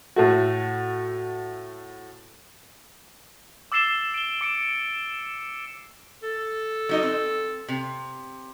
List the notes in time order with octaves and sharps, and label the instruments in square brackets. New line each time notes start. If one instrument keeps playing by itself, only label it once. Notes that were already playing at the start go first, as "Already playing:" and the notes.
[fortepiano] A2 A3 F#4
[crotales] D6 E6 A6 C7 E7 G7
D7 G7
D6 C#7 D7
[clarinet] A4
[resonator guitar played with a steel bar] F#3 D#4 D#5
C4
C3